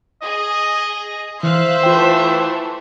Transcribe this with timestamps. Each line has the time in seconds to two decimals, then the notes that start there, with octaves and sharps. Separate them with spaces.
0.23 G#4 D#5
1.43 E3 C5 E5 F5 F#6
1.83 E3 A3 F4 G5